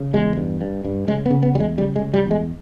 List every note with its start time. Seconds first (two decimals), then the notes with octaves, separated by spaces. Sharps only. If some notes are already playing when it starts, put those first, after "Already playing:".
Already playing: C#3
0.13 E2 G#3
0.37 G2
0.61 G2
0.85 G2
1.07 C#3 G#3
1.26 B3
1.30 C#3
1.43 B3
1.54 E2 G3
1.60 G#3
1.77 C#3 G3
1.96 G#3
2.01 C#3
2.14 G3
2.26 E2
2.31 G#3